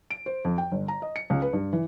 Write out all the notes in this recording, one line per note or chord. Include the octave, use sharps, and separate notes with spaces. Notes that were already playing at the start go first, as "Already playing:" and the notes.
D7
C5
F2
G5
G1
A#5
D#5
C#7
C#2
B4
G2
E3